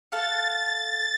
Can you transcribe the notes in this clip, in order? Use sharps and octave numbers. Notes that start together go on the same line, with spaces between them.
A4 F5 F#5 A6